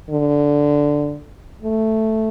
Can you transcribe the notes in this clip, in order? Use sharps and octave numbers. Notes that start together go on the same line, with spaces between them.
D3
A3